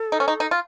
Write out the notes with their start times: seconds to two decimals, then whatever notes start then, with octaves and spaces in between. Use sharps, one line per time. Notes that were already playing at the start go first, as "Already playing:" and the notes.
Already playing: A4
0.12 D#4
0.20 C#4
0.28 D#4
0.40 D#4
0.51 F4